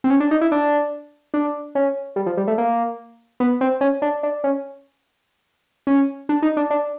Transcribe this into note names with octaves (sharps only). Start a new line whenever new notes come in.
C4
C#4
D4
D#4
E4
D4
D4
C#4
G3
F3
G3
A3
A#3
B3
C4
C#4
D4
D4
C#4
C#4
D4
D#4
D4
D4